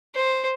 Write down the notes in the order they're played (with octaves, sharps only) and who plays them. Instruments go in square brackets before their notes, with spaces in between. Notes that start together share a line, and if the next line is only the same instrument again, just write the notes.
[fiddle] C5